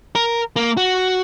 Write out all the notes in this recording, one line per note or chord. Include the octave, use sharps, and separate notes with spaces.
A#4
A#3
F#4